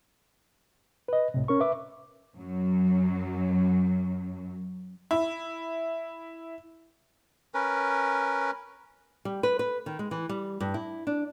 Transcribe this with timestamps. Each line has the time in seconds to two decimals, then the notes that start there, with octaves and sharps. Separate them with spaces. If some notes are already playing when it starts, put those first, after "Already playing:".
1.08 B4 D#5
1.34 C2 A2 C3
1.48 C#4 A#4 C#6
1.60 B4 E5 D6
2.35 F#2 F#3
5.11 E4
7.54 C#4 A#4 B4
9.25 G3
9.43 B4
9.59 B4
9.86 D#3
9.99 G#3
10.11 E3
10.29 G3
10.60 G2
10.74 E4
11.07 D4